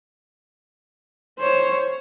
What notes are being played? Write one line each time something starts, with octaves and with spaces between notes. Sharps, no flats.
C5 C#5